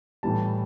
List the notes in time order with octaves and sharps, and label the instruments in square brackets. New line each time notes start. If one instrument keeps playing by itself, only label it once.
[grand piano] A2 E3 G3 A5